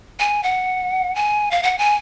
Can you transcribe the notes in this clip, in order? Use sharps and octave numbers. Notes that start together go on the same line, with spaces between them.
G#5
F#5
G#5
F5
F#5
G#5